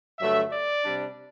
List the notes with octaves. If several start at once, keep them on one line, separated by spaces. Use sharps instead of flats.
G2 D3 F#3 A3 E5
D5
C3 G3 D4